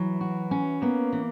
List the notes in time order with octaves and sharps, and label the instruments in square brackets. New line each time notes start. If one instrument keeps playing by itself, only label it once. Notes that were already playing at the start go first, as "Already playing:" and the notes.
Already playing: [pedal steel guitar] E3 [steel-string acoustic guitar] F#3
[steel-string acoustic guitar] F#4
C#4
[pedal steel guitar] A#3 [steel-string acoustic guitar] B3
[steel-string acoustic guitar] E3